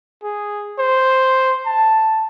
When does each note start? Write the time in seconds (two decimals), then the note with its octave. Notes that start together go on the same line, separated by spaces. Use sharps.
0.24 G#4
0.79 C5
1.67 A5